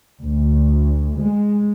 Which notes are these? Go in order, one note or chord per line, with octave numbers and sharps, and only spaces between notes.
D2
G#3